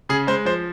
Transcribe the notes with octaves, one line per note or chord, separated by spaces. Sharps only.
C#3 G#4
G#3 C5
F3 C5